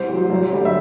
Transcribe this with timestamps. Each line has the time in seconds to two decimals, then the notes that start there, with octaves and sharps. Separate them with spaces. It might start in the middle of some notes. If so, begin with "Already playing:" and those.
Already playing: C2 C5
0.08 C3 F#3
0.30 F#2
0.53 D3 G3
0.65 E5